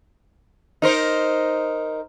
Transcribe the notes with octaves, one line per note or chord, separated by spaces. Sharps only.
D#4 A#4 C5